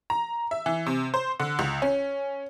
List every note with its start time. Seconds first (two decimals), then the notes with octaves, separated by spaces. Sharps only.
0.10 A#5
0.51 E5
0.66 E3
0.86 C3
1.14 C5
1.40 D3
1.59 C#2
1.82 C#4